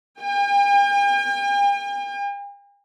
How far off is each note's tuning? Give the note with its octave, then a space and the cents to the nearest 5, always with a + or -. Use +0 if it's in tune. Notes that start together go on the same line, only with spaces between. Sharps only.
G5 +45